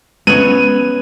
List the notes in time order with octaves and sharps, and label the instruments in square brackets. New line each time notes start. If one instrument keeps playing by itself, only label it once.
[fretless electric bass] G#3 C#4 [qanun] B3 C#5 [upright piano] D#7